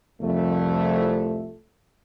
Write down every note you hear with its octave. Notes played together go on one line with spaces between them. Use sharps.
C2 F2 A3